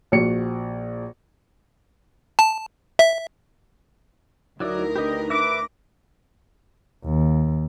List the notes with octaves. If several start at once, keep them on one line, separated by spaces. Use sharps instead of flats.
A#1 F#4 C#7
A5
E5
D2 F#3 D#4 E4 A#4 D5
D4 D#4 G4 B4 D#5
B4 E5 D6 A#6 D7
D#2